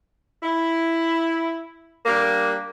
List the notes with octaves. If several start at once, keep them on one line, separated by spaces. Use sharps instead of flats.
E4
G3 A#3 D4